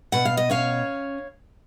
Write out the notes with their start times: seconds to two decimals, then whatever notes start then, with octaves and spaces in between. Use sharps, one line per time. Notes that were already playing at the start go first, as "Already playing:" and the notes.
0.12 B2 F#5
0.25 F5
0.37 D#5
0.50 C#4 C#5 F5